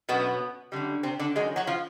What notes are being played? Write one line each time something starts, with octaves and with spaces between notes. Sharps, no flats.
F#2 B2 F#3 B3
F#2 D3 G3
C3 C4
D3 D4
F#2 D#3 F#3 G#3 G#4
F#3 F#4
F3 F4